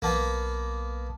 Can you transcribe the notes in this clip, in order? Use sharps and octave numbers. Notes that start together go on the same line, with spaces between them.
B1 A#3 B3 A5